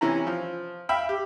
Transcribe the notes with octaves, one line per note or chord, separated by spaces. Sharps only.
C3 E3 C#4 E4 A#5
F3
E5 F5 G5 B5
G4